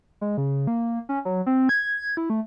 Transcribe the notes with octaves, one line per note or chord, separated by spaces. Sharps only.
G#3
C#3
A#3
C#4
F#3
C4
G#6
E4
A3